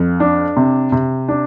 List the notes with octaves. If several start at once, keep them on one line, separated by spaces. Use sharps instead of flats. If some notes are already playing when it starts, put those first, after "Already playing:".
Already playing: F2
D4
C3
C3
D4